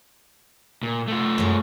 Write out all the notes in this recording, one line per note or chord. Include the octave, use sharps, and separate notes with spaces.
A#2
A3 F4
F#2 G#3